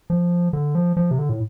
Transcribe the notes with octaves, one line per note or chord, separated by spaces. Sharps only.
F3
D3
F3
F3
C3
D3
A2